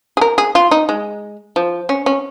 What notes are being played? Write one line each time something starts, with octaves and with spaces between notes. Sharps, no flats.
G#4
A#4
G#4
F4
D#4
G#3
F3
C#4
C#4